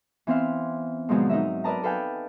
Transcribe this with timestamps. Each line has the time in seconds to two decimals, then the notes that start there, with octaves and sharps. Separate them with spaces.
0.27 E3 B3 C4 E5 F5 C6
1.09 G#2 B2 D3 F3 F#3 G#3
1.29 D#4 A#4 D#5 E5
1.64 A#4 B4 D5 D#5 A5 A#5
1.83 A4 B4 F5 G5 G#5